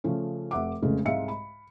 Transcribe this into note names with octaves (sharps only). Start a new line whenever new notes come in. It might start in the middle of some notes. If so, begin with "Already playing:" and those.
C#3 F3 A3 C#4
F1 E5 F#5 D6
F1 C#3 G#3 A3
C2 G#2 G#3 E5 F5 C#7
B5